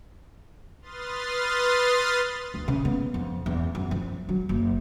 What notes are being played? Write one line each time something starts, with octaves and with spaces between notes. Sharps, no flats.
B4 C6 D#6 F6 A6
D2
C#3
B3
F2
E2
F#2
F3
F#3
F#1